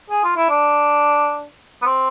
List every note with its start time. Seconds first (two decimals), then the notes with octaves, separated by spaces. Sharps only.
0.10 G#4
0.24 F4
0.36 E4
0.49 D4
1.82 B3
1.86 C4